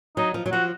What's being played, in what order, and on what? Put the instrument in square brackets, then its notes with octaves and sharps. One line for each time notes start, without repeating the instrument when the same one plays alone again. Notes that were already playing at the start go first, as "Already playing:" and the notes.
[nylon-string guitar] F#3 [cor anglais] D#4
[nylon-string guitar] F3
F#3
[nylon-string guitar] F3 [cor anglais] F#4